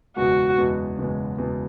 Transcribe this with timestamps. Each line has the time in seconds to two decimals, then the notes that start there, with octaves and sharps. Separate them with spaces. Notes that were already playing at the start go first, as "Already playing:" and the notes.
0.16 F#1 E2 B2 G#3 F#4
0.57 F#1 E2 B2 G#3
0.98 F#1 E2 B2 G#3
1.38 F#1 E2 B2 G#3